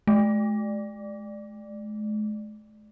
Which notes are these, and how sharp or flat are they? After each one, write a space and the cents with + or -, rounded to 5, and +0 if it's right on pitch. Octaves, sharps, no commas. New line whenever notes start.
G#3 +45